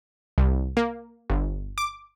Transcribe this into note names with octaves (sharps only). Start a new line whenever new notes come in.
C2
A#3
G1
D6